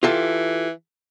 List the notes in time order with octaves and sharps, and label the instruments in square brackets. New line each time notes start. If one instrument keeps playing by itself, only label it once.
[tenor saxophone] E3 [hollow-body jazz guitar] F4 G4 A4